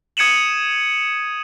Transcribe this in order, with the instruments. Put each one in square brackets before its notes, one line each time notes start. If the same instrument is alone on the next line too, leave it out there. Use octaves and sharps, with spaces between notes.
[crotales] D#6 G#6 C#7 D#7 E7 F#7